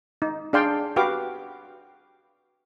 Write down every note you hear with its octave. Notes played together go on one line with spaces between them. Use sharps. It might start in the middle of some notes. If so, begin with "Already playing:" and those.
D#4
D4 G#4 D5 F5 G5 C6
F#4 G4 B4 F5 D6